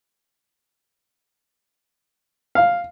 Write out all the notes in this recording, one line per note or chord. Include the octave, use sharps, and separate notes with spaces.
F5